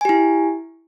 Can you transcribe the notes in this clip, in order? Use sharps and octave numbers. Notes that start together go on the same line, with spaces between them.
E4 G4 G#5